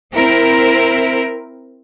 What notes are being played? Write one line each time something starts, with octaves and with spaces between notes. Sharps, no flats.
C4 E4 A#4 C5